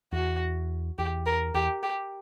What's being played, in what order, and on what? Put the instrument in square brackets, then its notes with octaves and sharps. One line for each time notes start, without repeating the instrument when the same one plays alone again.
[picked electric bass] E2 [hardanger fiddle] F#4
[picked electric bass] E2 [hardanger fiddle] G4
[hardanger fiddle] A#4
[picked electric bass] E2 [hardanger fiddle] G4
[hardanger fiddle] G4